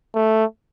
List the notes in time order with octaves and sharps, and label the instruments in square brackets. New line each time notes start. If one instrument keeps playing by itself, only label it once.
[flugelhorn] A3